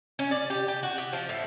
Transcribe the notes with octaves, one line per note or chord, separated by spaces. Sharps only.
C#4
D5
G4
G4
F#4
G4
F3
A2